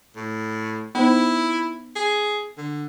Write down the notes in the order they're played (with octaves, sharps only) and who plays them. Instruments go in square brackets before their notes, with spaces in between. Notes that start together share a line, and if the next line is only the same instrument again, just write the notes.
[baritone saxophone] A2
[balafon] B3 D#4 C5 [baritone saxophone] E4
[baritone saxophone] G#4
D3